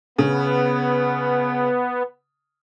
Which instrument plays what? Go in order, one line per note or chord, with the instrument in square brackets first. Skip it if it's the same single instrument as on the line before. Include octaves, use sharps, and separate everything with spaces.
[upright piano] C#3 [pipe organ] B3